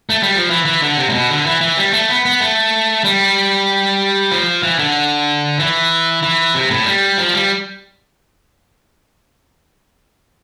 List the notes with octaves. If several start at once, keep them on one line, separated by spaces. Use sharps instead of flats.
A3
G3
F3
E3
E3
D3
C3
A2
B2
D3
E3
E3
G3
A3
B3
B3
A3
G3
F3
E3
D3
E3
E3
C3
A2
G3
F3
G3